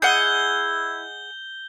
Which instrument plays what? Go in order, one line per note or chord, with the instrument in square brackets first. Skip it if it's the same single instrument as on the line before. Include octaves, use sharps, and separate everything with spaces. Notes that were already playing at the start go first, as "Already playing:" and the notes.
[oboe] E4 [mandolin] G#4 D#5 F#5 [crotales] G6 G7